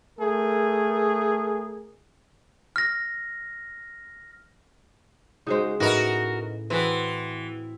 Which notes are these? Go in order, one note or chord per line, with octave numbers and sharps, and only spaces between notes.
A3 G#4 A#4
F6 A#6
C#3 G#3 D#4 F#4 C5
A2 D#4 F#4 A#4 B4 D#5
E3 C4 F#4 G#4 B4 C6 B6 E7